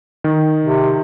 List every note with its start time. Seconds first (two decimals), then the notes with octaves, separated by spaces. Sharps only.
0.24 D#3
0.65 C3